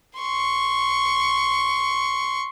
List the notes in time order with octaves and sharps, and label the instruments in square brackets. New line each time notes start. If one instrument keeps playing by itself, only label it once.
[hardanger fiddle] C6 C#6